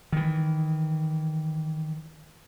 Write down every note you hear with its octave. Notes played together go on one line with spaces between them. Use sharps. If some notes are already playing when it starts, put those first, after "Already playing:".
D#3 E3